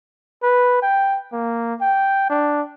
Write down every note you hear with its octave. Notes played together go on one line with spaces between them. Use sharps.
B4
G5
A#3
G5
D4